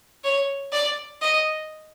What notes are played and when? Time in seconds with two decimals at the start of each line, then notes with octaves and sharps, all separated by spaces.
0.24 C#5
0.72 D5
1.21 D#5